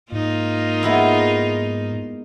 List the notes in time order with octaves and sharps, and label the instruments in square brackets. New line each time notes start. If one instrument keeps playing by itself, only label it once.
[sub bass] G#2 [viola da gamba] A#3 D#4 F4
[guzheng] G#3 B3 E4